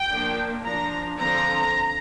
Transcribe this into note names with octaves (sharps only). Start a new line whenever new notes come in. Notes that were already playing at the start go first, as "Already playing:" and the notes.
Already playing: G5
F3 A#3 D4
F3 D4 A#5
D3 F3 C4 A#5